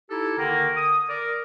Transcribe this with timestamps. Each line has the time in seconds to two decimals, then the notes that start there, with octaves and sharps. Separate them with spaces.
0.10 D#4 E4 G4 A4
0.38 D3 D#3 A#3
0.77 D#6
1.09 A#4 D5